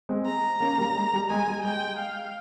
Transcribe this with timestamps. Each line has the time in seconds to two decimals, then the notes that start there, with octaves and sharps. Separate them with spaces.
0.09 G#3 C4
0.26 A#5
0.60 A#3 C#4
0.78 G3 A#3
0.95 G#3
1.13 G3
1.30 G#3 G#5
1.48 G3
1.65 G#3 G5
1.99 F5